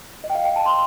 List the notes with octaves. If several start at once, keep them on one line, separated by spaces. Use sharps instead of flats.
D#5
G5
F5
G5
A5
C6